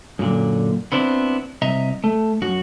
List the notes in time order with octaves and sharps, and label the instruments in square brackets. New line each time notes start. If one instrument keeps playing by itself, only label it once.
[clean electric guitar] F#2 A#2 D3
B3 C4 D4 E4
C2 D#5 E5 A#5
A3
F#2 F#4